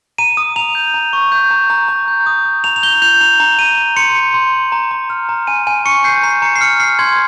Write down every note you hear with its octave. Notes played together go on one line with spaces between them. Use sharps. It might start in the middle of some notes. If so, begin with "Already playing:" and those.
A#5 D#7
D#6
A#5 F7
G6
A#5
C#6
G6
A#5
A#5
A#5
G6
D#6
D#6
A#5 F7
F7
G6 G7
G6 F7
A#5 F7
A#5
A#5 D#7
A#5
C6 C#7
C6
C6
C6
A#5
A#5
F6
A#5
G#5 D#7
G#5 D#7
C#6 C#7
G6 C7
A#5 C7
A#5 C#7
C7
F6 C#7
F6 C7
C6 G#6